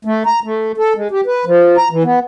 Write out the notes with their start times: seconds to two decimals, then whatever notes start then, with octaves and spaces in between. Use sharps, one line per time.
0.05 A3
0.26 A#5
0.44 A3
0.78 A4
0.95 G#3
1.11 G4
1.26 B4
1.45 F3
1.77 A#5
1.91 E3
2.03 B3